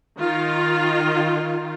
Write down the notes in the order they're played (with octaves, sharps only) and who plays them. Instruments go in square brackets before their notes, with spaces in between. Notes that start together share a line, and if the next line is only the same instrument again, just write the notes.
[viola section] D#3 F4